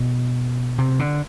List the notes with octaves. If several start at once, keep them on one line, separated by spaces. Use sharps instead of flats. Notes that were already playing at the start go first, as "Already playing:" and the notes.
Already playing: B2
C3
D3